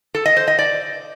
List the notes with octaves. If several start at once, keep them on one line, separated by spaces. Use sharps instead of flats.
A4
D#5
C5
D#5
D5